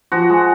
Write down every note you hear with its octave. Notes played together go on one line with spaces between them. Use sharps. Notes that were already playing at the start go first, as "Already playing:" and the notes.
F3 F#4
G#3